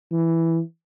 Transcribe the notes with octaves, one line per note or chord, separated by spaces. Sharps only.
E3